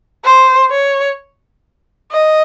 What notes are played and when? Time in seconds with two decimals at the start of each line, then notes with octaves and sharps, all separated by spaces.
0.25 C5
0.71 C#5
2.11 D#5